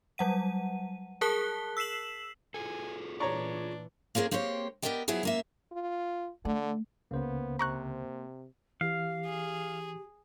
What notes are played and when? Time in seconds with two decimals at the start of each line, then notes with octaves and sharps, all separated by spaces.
0.18 F#3 G3 F#5 D#7
1.21 G#4 A#4 A5 F#6 B6 G7
1.77 E6 B6 C7 E7 F#7
2.54 F4 G#4 A4 G#5
3.20 A#2 E3 D4 C#5 A#5 C#6
4.15 A#3 C4 C#4 G#4 A#4
4.31 A#3 C4 G4 C5 C#5
4.82 B3 G4 A#4 D5 D#5 G5
5.08 F3 F#3 B3 E4 G#4
5.23 F#2 A#3 E5
5.72 F4
6.45 D3 A3
7.11 C#2 C#3 A#3 B3 C5
7.59 C3 A#5 C#6 F#6
8.81 E3 G4 F5
9.25 G#4